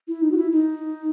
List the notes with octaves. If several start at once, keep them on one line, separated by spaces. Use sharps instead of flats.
E4
D#4
F#4
E4
D#4